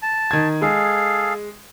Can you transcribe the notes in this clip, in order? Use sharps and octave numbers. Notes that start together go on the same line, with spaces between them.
A5
D#3 G#6
G#3 G#4 A4 F5